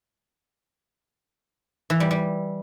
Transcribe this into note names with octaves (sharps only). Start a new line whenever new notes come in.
E3
G3
G3